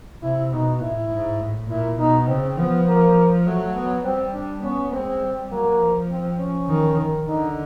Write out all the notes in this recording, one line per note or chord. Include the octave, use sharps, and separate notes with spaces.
C3 E4
B2 D#4
A2 E4
G#2
A2
A#2 E4
B2 D#4
C#3 C4
F3 B3
A#3
F#3 A3
B3
G3 C4
D4
B3 C#4
G#3 C4
G3
F#3 A#3
F3
C4
C#4
D#3
D3 D#4